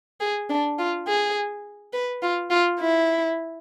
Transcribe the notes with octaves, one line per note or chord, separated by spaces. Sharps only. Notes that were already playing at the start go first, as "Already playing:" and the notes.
G#4
D4
F4
G#4
B4
F4
F4
E4